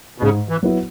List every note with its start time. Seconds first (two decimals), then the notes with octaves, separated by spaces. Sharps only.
0.18 B2
0.22 G#2 C#3
0.49 E3
0.63 F#3 B3 E4